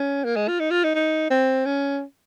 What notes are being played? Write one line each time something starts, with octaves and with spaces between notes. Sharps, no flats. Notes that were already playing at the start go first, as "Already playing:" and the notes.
Already playing: C#4
A#3
G#3
F4
D#4
F4
D#4
D#4
C4
C#4